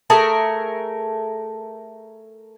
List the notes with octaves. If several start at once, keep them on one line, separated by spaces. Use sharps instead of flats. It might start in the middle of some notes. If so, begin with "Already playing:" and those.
A3 G#4 A#4 E5